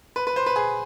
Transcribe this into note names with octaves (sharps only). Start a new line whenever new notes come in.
B4
B4
C5
B4
G#4